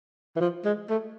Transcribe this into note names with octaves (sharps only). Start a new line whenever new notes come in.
E3
F3
G#3
A3